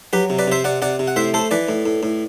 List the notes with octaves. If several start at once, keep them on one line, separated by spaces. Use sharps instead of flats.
F#3 G4 B4
C3
B4 D5
C3 C5 E5
C3 D5 F#5
C3 D5 F#5
C3
F#5
A2 C5 E5
A3 A4 C5
E3 B4 D5
A2
A2
A2